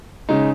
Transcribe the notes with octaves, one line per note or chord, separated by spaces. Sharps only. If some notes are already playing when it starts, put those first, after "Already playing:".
C#3 G#3 D#4